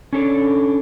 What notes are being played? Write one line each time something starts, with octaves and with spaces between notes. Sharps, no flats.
C#4 D4 A4 A#4 C#5 D5